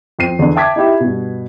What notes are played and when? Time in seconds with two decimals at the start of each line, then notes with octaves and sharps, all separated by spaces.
0.19 F2 C4 C7 D#7
0.39 E2 D3
0.55 E5 G5 A5 D6 G#6 B6
0.76 D#4 E4 G4 E5
1.00 G2 B2